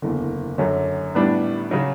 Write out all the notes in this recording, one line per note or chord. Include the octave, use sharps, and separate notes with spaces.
F#1 E2 D3
F#2 D3 F#3 C#4
A2 G3 B3 D4
C#3 F#3